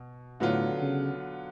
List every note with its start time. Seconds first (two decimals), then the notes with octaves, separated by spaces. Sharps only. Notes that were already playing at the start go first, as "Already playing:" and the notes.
Already playing: B2
0.40 A2 D3 F#3 B3 F4
0.81 C#3